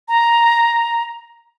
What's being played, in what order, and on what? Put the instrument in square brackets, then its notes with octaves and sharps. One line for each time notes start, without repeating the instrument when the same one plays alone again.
[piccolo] A#5